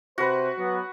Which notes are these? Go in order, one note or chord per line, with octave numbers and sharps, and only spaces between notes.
C3 F#4 B4 C5
F#3 B3